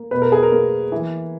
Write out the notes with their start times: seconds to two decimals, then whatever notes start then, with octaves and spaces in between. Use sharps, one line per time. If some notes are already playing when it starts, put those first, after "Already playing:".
Already playing: A#3
0.11 B2 B4
0.22 A#4
0.32 G#4
0.43 A#4
0.52 A#3
0.92 E3